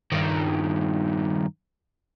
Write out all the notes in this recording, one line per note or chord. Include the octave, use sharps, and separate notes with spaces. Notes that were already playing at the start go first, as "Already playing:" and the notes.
G2 D#3